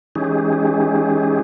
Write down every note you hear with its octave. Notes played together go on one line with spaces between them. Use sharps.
E3 G#3 C#4 D#4 G4 G#4